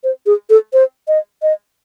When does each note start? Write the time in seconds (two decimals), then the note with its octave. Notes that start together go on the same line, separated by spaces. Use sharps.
0.04 C5
0.26 G#4
0.50 A4
0.73 C5
1.08 D#5
1.42 D#5